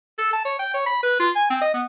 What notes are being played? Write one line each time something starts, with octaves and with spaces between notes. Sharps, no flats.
A4
A5
C#5
G5
C#5
B5
B4
F4
G#5
C4
D#5
B3